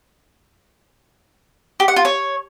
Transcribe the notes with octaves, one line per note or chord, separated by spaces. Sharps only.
G4
F#5
F4
C#5